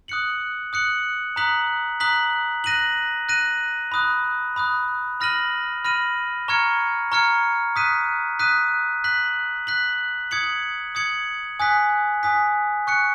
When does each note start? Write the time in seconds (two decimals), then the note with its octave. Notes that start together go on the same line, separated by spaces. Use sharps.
0.08 D#6 F#6 C#7 F#7
0.73 D#6 F#6 C#7 F#7
1.36 A#5 D#6 F#6 B6 F#7
2.00 A#5 D#6 F#6 B6 F#7
2.64 F#6 A#6 D#7 F#7
3.29 F#6 A#6 D#7 F#7
3.92 B5 D#6 F#6
4.56 B5 D#6 F#6
5.20 B5 F6 A#6 D#7 F#7
5.84 B5 F6 A#6 D#7 F#7
6.48 A#5 C#6 F6 G#6 C#7
7.12 A#5 C#6 F6 G#6 C#7
7.76 D#6 F#6 B6 D#7
8.39 D#6 F#6 B6 D#7
9.04 F#6 B6 F#7
9.67 F#6 B6 F#7
10.31 D#6 G#6 C#7 F#7
10.95 D#6 G#6 C#7 F#7
11.60 G#5 D#6 F#6 B6
12.23 G#5 D#6 F#6 B6
12.87 C#6 F#6 C#7